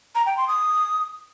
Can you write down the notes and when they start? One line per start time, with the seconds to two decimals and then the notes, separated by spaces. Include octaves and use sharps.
0.15 A#5
0.26 G5
0.37 C6
0.48 D#6